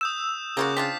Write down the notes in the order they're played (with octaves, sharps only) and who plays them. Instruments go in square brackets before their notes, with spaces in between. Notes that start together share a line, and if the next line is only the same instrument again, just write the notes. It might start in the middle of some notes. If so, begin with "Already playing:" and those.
[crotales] D#6 G6 E7 [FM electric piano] E6
[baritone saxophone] C#3 [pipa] A#3 F4 F#4 [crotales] D6 G6
[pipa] C4 D4 F4 [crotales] B6